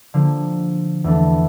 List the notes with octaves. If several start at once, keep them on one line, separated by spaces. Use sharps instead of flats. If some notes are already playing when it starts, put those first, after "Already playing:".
D3 F3 A#3
E2 E3 A3 D4 A4